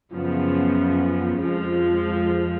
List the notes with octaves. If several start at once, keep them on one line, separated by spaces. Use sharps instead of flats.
F#2 C#3 F3 B3
F2 F3 G#3